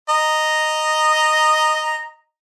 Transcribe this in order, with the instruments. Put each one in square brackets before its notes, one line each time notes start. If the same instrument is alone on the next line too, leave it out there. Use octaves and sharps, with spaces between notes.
[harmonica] D#5 A#5